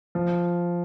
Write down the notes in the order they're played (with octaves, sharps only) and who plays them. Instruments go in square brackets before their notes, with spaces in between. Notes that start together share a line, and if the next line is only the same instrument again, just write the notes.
[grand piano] F3